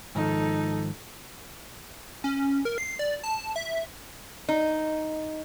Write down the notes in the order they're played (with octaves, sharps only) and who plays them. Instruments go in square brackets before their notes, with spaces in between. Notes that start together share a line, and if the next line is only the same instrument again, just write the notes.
[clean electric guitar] G#2 D#3 F3 [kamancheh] D#4 A4
[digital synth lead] C#4
A#4
C7
D5
A5
E5
[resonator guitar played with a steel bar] D#4